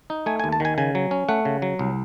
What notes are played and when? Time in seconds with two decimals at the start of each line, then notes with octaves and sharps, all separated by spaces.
0.10 D#4
0.26 A3 G#5
0.39 G#5
0.44 D#2
0.52 A5
0.60 D#3 G#5
0.78 C#3 G#5
0.95 F#3
1.11 C#4
1.29 A3 F#5
1.45 C#3
1.62 F#3
1.79 C2